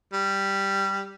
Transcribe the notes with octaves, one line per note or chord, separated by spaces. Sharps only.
G3